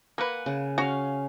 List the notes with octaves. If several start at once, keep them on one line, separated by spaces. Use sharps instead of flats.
A#3 B4 F#5 G#5
C#3
C#4 F#4 F5